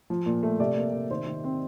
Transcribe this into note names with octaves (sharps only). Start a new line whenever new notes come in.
F3
A#2
A3
C3 D5
A#3
C3
D#3 C5
D#3
C4